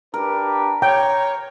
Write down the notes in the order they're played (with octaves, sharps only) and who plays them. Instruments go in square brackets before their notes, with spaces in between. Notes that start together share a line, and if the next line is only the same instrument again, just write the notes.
[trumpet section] D4 G4 B4 [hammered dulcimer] A#4
[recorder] C#5 [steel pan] G5 [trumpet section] A#5